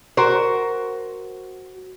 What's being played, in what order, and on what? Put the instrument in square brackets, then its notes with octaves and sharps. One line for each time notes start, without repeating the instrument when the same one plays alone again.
[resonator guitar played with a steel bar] F#4 A#4 C5